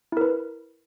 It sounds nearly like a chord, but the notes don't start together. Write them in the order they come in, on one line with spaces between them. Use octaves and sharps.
E4 A#4 B4